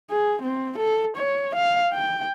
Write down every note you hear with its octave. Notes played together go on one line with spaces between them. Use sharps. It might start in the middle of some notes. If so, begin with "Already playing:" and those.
G#4
C4
A4
C#5
F5
G5